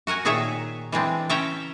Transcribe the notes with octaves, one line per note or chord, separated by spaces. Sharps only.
F#4 A#4 F#5 G#5
A#2 D#3 G#4 C#5 E5 A#5
E3 G#3 C4 D4
C#3 C#4 E5 G5 A#5